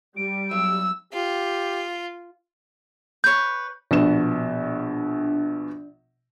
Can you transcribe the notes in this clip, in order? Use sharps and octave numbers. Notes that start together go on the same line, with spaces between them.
G3 D7
B1 E6
F4 G4
B4 C#5 G6
A#1 B2 D4 E7